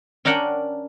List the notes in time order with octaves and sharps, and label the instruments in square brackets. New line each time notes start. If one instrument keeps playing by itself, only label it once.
[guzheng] C#4 D4 A#4 F#5 G5